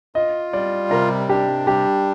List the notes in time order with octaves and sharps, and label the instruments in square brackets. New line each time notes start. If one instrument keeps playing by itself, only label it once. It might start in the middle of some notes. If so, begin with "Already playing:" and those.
[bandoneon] F4 [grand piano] D#5
[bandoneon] G3 [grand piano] D5
[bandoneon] C3 [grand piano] A#4
[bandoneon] D4 [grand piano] G4
[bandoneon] G3 [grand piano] G4